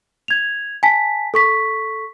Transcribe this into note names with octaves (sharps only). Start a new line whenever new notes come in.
G#6 F7
G#5 A5 B6
A4 C#6 B6